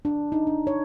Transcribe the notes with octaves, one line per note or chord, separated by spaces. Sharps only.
D4
D#4
D4
C#5